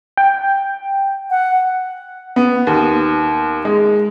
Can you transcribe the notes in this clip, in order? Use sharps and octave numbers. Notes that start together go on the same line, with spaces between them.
G5
F#5
B3
D#2
G#3